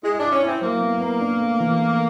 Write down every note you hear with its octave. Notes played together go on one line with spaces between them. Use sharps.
G#3 E4
D4
E4
C#4
C4 E4
F#3 A#3
B3
B3
D4
A3
E3
A3